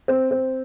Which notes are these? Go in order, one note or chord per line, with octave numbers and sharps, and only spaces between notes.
C4
C4